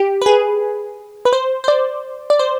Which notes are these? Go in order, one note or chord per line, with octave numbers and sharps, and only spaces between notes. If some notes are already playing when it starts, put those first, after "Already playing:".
Already playing: G4
B4
G#4
B4
C5
C5
D5
D5
C5